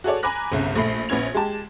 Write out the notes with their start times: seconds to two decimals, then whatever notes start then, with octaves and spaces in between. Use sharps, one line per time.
0.04 F#4 G#4 A4 C#5 D5
0.23 G#5 A#5 B5 D6 F#6 A#6
0.52 G1 C2 C#3
0.75 A#1 A3 B5 C7
1.09 A#1 B3 C#4 G#6 F7
1.35 G#3 G4 A5